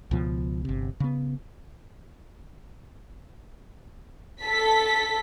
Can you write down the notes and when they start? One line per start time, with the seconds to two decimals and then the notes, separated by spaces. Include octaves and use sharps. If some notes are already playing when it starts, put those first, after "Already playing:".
0.11 C#2 B2 F3
0.65 G1 C3
1.00 C#3 B3
4.43 A4 B6